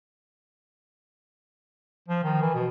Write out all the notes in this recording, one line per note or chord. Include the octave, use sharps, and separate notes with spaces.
F3
D#3
E3
B2